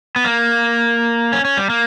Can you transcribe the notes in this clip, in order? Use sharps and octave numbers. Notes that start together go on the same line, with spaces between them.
B3
A#3
C#4
C#4
G3
A#3